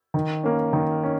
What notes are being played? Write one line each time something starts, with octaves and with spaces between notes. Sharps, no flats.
D#3
A#3 C#4
D#3
C#4